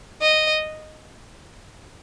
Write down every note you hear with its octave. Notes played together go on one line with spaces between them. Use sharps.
D#5